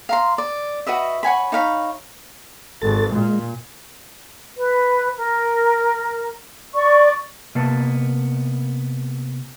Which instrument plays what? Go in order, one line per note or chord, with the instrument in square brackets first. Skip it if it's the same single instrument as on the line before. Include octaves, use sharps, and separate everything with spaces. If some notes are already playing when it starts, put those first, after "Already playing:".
[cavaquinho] F5 A#5 C6
D5
F#4 B4 D#5 E5
C#5 F#5 G#5 B5
D#4 C#5 F5 B5
[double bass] G#1 [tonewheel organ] A4 A6
[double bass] A#2 [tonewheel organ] G#3
[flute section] B4
A#4
D5 C#6
[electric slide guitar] C3 A#3 B3 A5